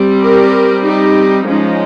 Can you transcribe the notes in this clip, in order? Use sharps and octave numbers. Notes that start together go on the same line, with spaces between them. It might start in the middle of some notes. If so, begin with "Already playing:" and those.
Already playing: G3 C4
G4 A#4
D#4 G4
F3 G#3 C#4 D#4